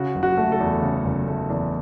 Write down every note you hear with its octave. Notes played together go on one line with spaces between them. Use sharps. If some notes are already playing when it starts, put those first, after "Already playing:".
Already playing: C#3 F#4
F#1
F#4
A3
A4
E2
C#3
F#1
A3
E2